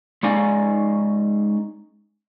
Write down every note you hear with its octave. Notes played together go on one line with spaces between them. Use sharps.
G#3 C#4 D#4 D5 F5 G#5